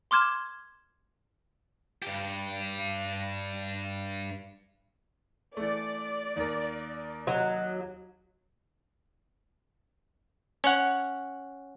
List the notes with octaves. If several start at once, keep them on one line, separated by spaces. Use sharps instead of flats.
C6 D6 F6 G#6 E7
G2 G4
E3 A3 D5
D#2 A#4
F#3 D#5
C#4 C#5 F#5